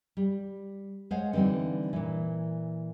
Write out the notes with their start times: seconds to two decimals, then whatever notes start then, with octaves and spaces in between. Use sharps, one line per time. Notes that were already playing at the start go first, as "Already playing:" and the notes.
0.17 G3
1.11 G#3 C5 C#5 F5 F#5 G#5
1.33 D3 E3 G3 C4 D#4
1.93 A#2 E3